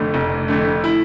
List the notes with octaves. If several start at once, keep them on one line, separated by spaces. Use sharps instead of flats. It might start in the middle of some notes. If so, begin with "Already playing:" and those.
Already playing: F1 F2 D3 A3
F1
F2 D3 A3
E4